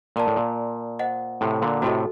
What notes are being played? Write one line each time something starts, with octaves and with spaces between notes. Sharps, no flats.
A#2 A#4 D5 A5
A2
A#2
C5 D#5 F#5
A2 C3
A#2 D3
A2 C3 F#4 A4 D#5